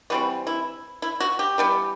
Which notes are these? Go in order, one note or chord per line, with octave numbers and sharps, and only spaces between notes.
E3 G3 C4 F#4
E4
E4
F#4
G4
E3 G3 B3